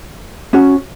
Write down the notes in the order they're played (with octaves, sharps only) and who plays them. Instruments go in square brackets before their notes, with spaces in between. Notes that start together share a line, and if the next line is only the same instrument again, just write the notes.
[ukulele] C#4 F#4